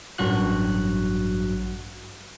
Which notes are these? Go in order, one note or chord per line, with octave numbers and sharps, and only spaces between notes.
A1 G2 F#3 F#4 F#6